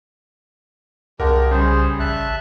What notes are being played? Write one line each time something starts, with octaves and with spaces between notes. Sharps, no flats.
C2 C#3 G#3 G4 A#4 F#5 A5
C#3 G3 G#4 C5
A1 E5 A5 F#6